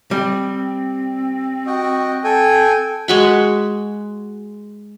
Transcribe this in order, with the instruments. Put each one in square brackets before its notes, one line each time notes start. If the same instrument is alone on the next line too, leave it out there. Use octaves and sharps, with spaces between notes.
[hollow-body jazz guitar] G3 [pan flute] C4
[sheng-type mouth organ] F#4 D#5 G5
A4 G5 G#5
[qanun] G#3 F#4 B5